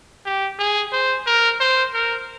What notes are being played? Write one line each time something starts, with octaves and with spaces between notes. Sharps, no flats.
G4
G#4
C5
A#4
C5
A#4